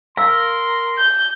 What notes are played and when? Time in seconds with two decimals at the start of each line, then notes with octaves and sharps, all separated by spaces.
0.17 A#4 F5 C6 E6
0.98 G6